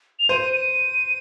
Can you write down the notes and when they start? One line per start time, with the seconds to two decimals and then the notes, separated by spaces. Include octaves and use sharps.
0.19 F7
0.29 C5 D#7
0.41 D#7
0.53 D#7